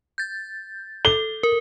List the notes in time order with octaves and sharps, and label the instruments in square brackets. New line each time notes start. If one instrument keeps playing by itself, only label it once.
[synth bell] G6 A6
[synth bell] A4 [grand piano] G7
[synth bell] A#4